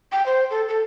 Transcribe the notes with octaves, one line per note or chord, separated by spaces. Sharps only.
G5
C5
A4
A4